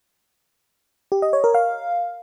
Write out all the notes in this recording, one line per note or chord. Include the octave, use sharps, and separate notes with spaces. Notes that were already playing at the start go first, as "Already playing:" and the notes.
G4
D#5
C#5
A#4
F5